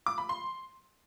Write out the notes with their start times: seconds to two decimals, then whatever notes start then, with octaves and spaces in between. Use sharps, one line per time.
0.06 D6
0.18 B5
0.29 C6